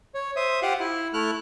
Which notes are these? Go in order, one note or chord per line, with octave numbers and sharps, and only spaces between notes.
C#5
C5 E5 D#6
F4 G4 F5 F#5
E4
A3 E4 F6 F#6